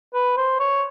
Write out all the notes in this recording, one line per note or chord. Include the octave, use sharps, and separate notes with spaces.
B4
C5
C#5